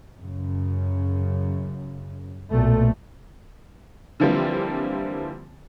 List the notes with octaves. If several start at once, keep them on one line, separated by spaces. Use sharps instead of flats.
F#2 C#3
B1 A#2 A3
D3 E3 F3 G3 A#3 C4